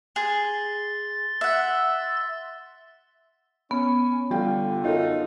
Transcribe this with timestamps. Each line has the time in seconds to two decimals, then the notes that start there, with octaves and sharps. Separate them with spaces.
0.16 G#4 C6 A6
1.41 E5 F#5
3.71 B3 C#4
4.30 D3 G3 F4 G5
4.84 F#2 D#4 F4 A4